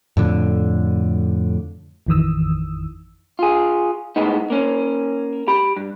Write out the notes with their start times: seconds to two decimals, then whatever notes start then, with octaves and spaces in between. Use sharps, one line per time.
0.17 F2 A2 D3
2.07 A1 F2 D#3 E3 D#6 E6
3.39 F4 G#4
4.16 A2 G#3 B3 D#4
4.50 A#3 C#4
5.48 G4 B5
5.77 G2